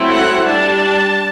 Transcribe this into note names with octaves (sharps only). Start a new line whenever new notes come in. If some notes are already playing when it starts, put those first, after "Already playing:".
Already playing: F#3 A3 C4 E4
F#5
G3 D4 A5